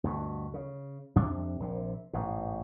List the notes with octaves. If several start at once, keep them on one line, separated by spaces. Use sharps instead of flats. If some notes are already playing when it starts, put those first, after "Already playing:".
D2 G2 B2
C#3
F2 C3 D4
A#1 C3
A1 G#2 B2